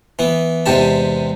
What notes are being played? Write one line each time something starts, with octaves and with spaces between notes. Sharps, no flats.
E3 B3
E2 G#2 C3 G4 A5